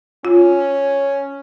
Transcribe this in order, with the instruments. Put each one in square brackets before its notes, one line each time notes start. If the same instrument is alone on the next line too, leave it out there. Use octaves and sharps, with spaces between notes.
[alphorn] C#4 [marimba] F4